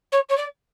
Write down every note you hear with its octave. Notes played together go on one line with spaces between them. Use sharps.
C#5
C#5
D5